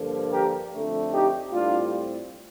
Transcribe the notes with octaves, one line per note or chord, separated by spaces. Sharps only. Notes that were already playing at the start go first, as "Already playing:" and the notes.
Already playing: G2 D3 F3 A#3
G4 A#4
F2 D3 A3
D#4 G4
A2 G3 C4 D4 F4